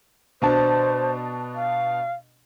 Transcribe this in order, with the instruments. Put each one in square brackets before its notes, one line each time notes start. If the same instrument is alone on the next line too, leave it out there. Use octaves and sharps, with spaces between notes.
[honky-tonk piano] B2 D4 A5 [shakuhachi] C5
[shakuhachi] F5